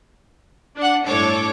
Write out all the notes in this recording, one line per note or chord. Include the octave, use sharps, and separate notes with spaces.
D4 F#5
G1 A2 D4 A4 C#5 D6